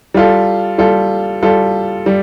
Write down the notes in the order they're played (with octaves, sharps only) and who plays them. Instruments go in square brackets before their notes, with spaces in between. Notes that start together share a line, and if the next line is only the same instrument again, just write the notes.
[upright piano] G3 F4 A4
G3 F4 A4
G3 F4 A4
G3